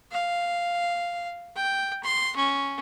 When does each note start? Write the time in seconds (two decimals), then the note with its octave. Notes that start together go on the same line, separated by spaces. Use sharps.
0.12 F5
1.56 G5
2.04 C6
2.36 C#4